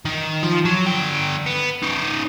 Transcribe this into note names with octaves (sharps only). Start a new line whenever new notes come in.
D#3
F3
F#3
D3 G5
B3
C#4 D#4